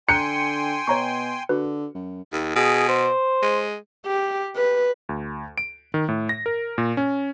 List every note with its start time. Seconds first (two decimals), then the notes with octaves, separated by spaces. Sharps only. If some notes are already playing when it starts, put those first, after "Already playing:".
0.09 D3 G5 G#5 A#5 C6 F#6 G6 C#7
0.87 B2 C#5 A#5 C#6
1.49 D3 F#4 B4
1.95 F#2
2.33 D#2
2.56 B2 G#4
2.89 C5
3.42 G#3
4.06 G4
4.56 B4
5.09 D2
5.58 D7
5.94 D#3
6.09 A2
6.29 A#6
6.46 A#4
6.78 A#2
6.97 C#4